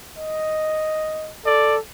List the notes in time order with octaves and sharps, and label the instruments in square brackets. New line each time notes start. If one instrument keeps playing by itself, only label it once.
[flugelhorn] D#5
[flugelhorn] A4 [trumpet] D5